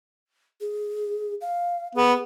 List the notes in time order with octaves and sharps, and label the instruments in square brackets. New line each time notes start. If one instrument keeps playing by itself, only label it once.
[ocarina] G#4
F5
[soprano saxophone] B3 [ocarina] G#4